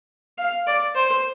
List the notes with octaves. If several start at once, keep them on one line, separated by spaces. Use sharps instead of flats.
F5
D5
C5